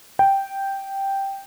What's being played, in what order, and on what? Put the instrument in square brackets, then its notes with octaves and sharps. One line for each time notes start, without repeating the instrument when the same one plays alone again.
[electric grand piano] G5